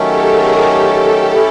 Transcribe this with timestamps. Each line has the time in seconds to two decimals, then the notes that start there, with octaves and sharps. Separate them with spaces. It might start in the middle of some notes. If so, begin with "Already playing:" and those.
Already playing: D#3 F#3 A3 C#4 G4 A4
0.26 G#4 A#4
0.62 G4 A4
1.35 C#4 E4